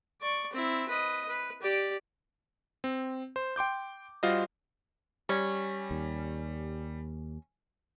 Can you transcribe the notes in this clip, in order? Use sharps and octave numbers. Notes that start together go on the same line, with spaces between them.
D5 C#6
C4 E4
B4 D#5
B4
G4 D5
C4
C5
G5 C6 D6 G6
G3 F4 F#4 C5 D#5
G3 C#4
D#2